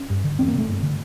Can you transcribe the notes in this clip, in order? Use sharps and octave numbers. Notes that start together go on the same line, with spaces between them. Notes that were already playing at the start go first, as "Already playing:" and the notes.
Already playing: C#4
G2
D3
E2 C4
A#3
C3
A3
G2
D3